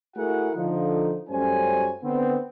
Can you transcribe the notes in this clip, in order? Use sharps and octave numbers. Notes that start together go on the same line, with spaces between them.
A3 E4 F#4 G#4 A#4 F#5
D3 F3 D#4
F#2 G3 A3 C#4 C5 G#5
D3 B3 C4